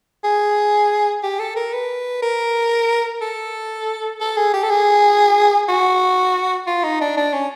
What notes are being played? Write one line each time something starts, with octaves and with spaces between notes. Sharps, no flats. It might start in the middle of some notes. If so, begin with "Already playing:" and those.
G#4
G4
A4
A#4
B4
A#4
A4
A4
G#4
G4
A4
G#4
F#4
F4
D#4
D4
D4
C#4